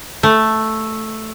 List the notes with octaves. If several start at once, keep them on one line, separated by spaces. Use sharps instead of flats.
A3